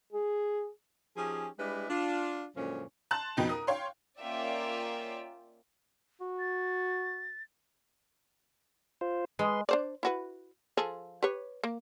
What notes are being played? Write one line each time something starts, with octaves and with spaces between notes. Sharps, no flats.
G#4
F3 C#4 D#4 G4 G#4
G3 G#3 D4 E4 G4 B4
D4 F4
F#2 A#2 D3 F3 G#3 C#4
A5 C6 F#6
F2 B2 D#4 G5
A#4 D#6
C#5 F5 G5 C6
A#3 C#4 F4 D5 E5 G5
F#4
A6
F4 C5
G#3 B4 C6
D4 C5 D5
E4 F#4 B4
F3 G#4 A4
G4 B4 C#5
A#3